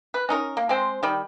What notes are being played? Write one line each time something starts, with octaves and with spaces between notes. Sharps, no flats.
B4
C#4 D#4 A#4
A#3
G#3 C4 C5
D#3 G3